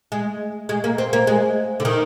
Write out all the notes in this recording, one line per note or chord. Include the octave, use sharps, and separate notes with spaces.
G#3
G#3
A#3
C4
A#3
G#3
D3
D#3